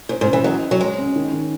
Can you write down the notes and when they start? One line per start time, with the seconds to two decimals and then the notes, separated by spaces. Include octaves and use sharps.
0.09 G#2 C#5
0.21 G#2
0.27 C#4
0.33 E3
0.44 F#3 D#5
0.62 C5
0.71 F#3
0.80 G#3 C#5
0.98 C#4
1.16 D#3
1.33 D#3